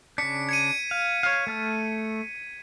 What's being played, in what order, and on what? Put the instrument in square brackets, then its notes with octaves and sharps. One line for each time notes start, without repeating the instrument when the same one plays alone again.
[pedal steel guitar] C#3 D4 [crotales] B6 C#7
[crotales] G#6 C#7 D#7
[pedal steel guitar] F5
C#5 F5
A3 A5 F6